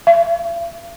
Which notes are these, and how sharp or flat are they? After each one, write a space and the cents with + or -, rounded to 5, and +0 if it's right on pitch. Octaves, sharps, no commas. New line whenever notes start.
E5 +45